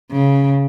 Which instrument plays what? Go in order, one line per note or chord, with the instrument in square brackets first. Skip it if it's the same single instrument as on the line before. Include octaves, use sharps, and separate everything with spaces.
[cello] C#3